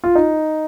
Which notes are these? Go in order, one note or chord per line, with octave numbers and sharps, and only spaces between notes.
F4
D#4